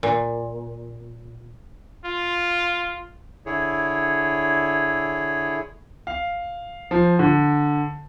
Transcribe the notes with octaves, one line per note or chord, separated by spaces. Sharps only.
A#2
F4
D3 E4 G#4 C#5
F5
F3
D3